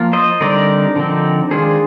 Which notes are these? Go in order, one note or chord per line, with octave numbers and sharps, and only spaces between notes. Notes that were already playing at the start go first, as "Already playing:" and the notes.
Already playing: F3 A#3 F4
C5 D#5
D3 G3 C4 D#4 A#4 D5
D3 F3 C4 D#4
D#3 G#3 D4 F4 G#4 C5